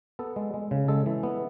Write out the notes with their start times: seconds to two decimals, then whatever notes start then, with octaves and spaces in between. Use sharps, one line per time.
0.19 B3 A4
0.36 G#3
0.54 G#3
0.71 C#3
0.88 G#3 A4
1.06 E3
1.23 B3